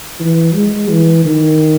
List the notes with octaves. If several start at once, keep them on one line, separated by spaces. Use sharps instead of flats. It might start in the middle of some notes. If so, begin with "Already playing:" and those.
E3
G#3
E3
D#3